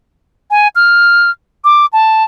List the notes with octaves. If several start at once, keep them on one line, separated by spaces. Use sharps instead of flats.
G#5
F6
D6
A5